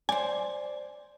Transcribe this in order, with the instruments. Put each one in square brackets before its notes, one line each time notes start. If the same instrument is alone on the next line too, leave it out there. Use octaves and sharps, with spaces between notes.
[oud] C5 D5 [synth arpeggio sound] G#5